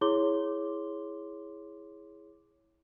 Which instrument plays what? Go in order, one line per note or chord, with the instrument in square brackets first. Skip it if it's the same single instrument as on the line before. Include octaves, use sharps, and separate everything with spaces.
[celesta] E4 G#4 C#5 C6 D6 G7